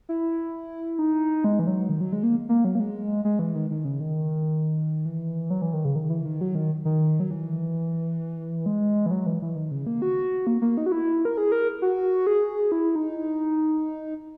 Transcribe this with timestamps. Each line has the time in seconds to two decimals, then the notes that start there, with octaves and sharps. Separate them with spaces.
0.09 E4
0.99 D#4
1.44 G#3
1.59 E3
1.67 F#3
1.89 D#3
2.01 F#3
2.12 G#3
2.23 A#3
2.49 A#3
2.65 F#3
2.75 A#3
2.80 G#3
3.25 G#3
3.39 E3
3.55 D#3
3.70 D#3
3.85 C#3
4.00 D#3
5.05 E3
5.50 F#3
5.62 E3
5.74 D#3
5.85 C#3
5.96 D#3
6.10 E3
6.25 D#3
6.41 F#3
6.55 D#3
6.85 D#3
7.20 F#3
7.31 E3
8.66 G#3
9.06 E3
9.11 F#3
9.26 E3
9.42 E3
9.56 D#3
9.71 C#3
9.86 A#3
10.02 F#4
10.47 A#3
10.62 A#3
10.77 D#4
10.86 F#4
10.92 E4
11.25 A#4
11.37 G#4
11.52 A#4
11.82 F#4
12.27 G#4
12.72 E4
12.96 D#4